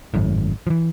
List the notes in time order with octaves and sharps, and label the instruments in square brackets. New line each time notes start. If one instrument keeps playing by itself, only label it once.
[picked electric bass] G#1 F#2 A2
E3 F3